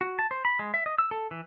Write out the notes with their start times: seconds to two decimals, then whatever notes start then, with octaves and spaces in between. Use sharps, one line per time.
0.01 F#4
0.19 A5
0.31 C5
0.45 B5
0.59 G#3
0.74 E5
0.86 D#5
0.98 E6
1.11 A4
1.31 E3